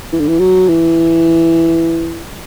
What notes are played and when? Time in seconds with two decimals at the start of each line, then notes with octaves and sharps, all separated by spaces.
0.12 E3
0.20 D3
0.28 E3
0.40 F#3
0.69 E3